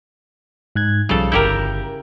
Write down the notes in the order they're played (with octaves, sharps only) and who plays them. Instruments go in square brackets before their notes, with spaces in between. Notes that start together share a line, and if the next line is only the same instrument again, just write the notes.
[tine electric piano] G#2 F#6 G#6
[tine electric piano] B1 F3 G3 [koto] C#3 A4
[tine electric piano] G1 G6 [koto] E4 G4 A#4